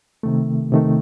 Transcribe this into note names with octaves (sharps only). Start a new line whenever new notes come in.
C3 D#3 A3
C3 D#3 A3